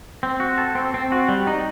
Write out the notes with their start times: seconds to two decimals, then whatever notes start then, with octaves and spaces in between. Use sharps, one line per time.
0.23 C4
0.40 F#4
0.58 A4
0.75 C4
0.94 C4
1.12 F#4
1.28 G3
1.47 D#4